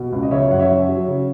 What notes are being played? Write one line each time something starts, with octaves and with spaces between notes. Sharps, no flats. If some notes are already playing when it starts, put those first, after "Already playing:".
Already playing: B2
C#2
D#5
C#3 C#5 E5
F#2 F#5
C#5 E5
F#2
F#3
C#3